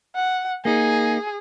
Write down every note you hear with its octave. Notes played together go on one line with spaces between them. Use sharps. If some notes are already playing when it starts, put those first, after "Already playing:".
F#5
A#3 D#4 G#4